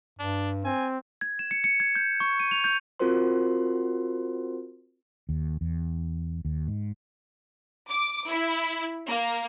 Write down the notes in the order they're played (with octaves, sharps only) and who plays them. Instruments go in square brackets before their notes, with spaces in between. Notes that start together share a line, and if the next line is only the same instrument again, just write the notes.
[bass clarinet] G2 [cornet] D4
[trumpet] C4 [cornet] G#5
[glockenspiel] G#6
E7
C#7
C#7
G#6
G6
C#6
D#7
F7
G6
[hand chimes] C4 F4 F#4 A#4 C5 C6
[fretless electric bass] D#2
E2
D#2
G#2
[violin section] D6
E4
A#3